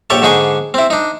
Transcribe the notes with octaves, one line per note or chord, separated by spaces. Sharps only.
A#1 G4 A4 C#5 A5
G#2 D3 D4 D#4 G#4 C#6
C4 E4
D4 D#4